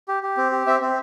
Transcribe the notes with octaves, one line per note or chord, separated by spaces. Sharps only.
G4
G4
C4
G4
C4 E5
C4